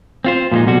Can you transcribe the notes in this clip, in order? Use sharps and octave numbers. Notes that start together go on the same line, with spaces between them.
C4 F4 C5
A#2 F3 G3 G#3 D#4
B1 B2 G3 F#4